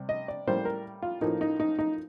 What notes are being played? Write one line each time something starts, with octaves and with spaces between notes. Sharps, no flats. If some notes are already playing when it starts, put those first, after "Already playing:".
Already playing: C3 G3
D#5
D5
A2 G3 A#3 C5
A#4
F4
A2 F3 A#3 D#4
D#4
D#4
D#4